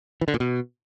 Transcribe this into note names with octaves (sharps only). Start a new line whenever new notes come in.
E3
D3
A#2
B2